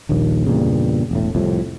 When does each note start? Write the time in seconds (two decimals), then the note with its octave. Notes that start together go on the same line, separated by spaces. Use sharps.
0.09 D#1 A#1 D#2 D#3
0.46 E2 G2 A#2 C#3
1.11 E1 A2
1.35 C2 F2 A2